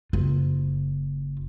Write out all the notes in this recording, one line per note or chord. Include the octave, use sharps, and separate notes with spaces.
F#1 F4